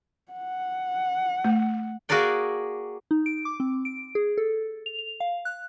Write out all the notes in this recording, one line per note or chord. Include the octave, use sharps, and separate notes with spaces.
F#5
A3
A#3 F#4 G#4 A#4 D5 G5
D#4
D7
D6
C4
D7
G#4
A4
F7
F7
F5
F#6